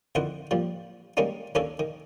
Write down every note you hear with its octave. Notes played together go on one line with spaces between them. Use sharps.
F2 D3 D#3 E4 C5 F#5
A#2 F3 G3
D#3 G3 G#3 A#3 C#4 D#4
D#2 A#3 C#4 D4 A4 C#5
D#3